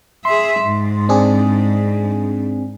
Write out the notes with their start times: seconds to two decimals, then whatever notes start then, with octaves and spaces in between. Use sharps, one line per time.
0.25 G#4 E5 C6
0.61 G#2
1.09 C4 D4 G#4